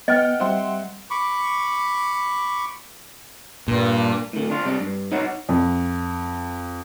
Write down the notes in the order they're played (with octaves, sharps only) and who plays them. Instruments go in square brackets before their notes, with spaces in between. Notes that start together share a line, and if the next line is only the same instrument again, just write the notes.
[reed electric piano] B3 [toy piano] D#5 [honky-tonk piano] F#5 G5 F6
[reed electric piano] G3 E5 [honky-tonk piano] C4 F#5 C6
[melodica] B5 C#6 D6
[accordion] G2 [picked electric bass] A#2
[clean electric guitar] A2 D3
D4 F4
C3 G3 D4
G2
D#4 C#5 F#5
[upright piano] F2